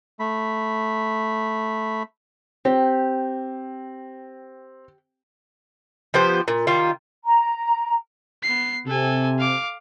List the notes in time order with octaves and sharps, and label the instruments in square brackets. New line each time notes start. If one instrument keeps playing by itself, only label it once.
[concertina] A3 B5
[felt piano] C4 [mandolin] G4
[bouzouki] F3 B3 G4 C5
A#2
D#3 G3 F4
[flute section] A#5
[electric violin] B3 C7
[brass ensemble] C3 [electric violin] A4 G#5
[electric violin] F5 D6